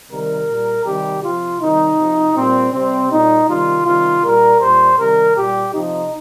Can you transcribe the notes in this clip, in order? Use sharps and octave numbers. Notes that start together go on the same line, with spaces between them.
C3 D#3 G3 A#4
A#2 G3
C3 D#3 G3 G4
C3 F3 F4
C3 D#3 G3 D#4
C3 F3
A#2 G3 C4
C3 G3 C4
A#2 G3 D#4
C3 D#3 G3 F4
C3 D#3 G3 F4
A#2 G3 A#4
A#2 G3 C5
C3 D#3 G3 A#4
A#2 G3 G4
C3 F3 D#4